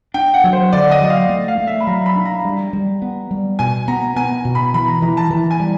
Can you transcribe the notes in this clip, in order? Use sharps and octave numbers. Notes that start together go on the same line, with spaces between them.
D4 G5
F#5
F#3
C5
D3 D5
D#5
F#3
F5
A3
F5
A3
E5
B5
F#3 A#5
B5
D4
A#5
G3
G3
B3
G3
B2 G#5
B3 A#5
B3 G#5
B2
B5
E3 B5
A#5
E3 A#5
A5
E3 A5
G#5
G3